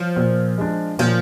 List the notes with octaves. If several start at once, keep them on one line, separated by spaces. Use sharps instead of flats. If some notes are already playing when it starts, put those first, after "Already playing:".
Already playing: F3
A#2
G#3 D4
A#2 F3